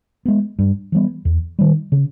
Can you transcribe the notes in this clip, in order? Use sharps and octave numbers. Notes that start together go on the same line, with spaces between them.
G#3 B3
G2
E3 G3 B3
E2
D#3 G3
C#3